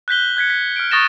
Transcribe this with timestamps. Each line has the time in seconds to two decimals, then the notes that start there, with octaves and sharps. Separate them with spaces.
0.08 F#6 G6 B6 G7
0.37 F#6 G#6 B6 C#7
0.50 B6
0.76 F6 D7
0.91 C#6 D#6 A6 A#6 E7 G7